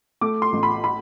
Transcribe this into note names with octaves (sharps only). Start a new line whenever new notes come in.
A3 D6
C6
A1
B5
B5